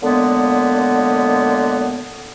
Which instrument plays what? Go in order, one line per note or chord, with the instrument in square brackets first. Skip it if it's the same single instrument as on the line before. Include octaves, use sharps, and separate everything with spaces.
[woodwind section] F#2 A#2 D3 G#3 A#3 B3